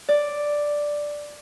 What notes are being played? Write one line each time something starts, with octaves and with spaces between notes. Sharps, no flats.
D5